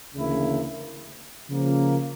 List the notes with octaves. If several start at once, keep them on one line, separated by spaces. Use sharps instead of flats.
D2 C#3 E3 A#3 E4
C#3 F3 A#3